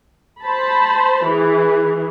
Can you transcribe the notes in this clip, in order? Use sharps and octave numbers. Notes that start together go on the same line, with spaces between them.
C5 A5 B5
E3 G#4